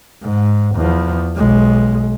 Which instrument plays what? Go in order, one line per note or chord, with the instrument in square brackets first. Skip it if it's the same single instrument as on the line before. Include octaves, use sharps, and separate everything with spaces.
[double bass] G#2
E2 F3
B1 G#3